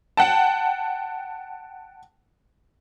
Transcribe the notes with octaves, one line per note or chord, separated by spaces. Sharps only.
F#5 G5 A5